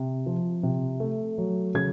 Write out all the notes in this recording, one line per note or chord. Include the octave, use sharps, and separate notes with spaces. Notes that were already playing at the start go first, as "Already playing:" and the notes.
Already playing: C3
F3
C3
A3
F#3
C#3 G#6